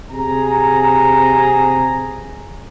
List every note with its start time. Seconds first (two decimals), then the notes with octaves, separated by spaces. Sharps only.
0.11 C3 G#4 A#5